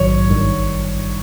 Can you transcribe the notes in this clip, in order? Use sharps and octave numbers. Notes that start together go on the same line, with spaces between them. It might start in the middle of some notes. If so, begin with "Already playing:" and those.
Already playing: A#1 G#2 D#3 F#3 C#5
G#1 G2 D#3 G3